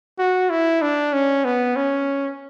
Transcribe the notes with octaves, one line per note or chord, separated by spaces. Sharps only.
F#4
E4
D4
C#4
B3
C#4